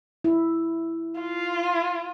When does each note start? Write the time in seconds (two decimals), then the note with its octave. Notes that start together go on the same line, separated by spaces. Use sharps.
0.24 E4
1.20 F4